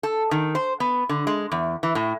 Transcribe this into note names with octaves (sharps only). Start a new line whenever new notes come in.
A4
D#3
C5
B3
D3
G#3
E2
E3
A2